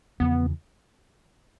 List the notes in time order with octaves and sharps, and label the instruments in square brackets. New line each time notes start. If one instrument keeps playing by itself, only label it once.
[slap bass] E2 C#3 F3 [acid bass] B3